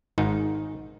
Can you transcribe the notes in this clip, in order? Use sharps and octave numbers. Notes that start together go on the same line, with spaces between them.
G#1 G#2 D#3 D#4